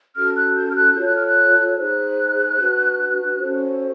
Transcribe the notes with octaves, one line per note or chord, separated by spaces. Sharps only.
C#4 F#4 A4 F6
F#6
G6
F6
F#6
F4 A4 C#5 G6
F#6
F6
F#6
D#4 G#4 C5 F#6
D4 F#4 B4
C#4 F#4 A4 C5